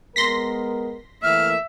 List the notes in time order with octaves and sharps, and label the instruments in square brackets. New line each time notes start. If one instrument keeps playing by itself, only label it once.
[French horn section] G#3 B3 A#4 [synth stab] C6 A#6 B6
[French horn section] E3 A3 A#3 [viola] E5 [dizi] F6